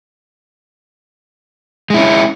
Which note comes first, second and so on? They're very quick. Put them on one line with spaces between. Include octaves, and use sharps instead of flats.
G#3 E4 C#4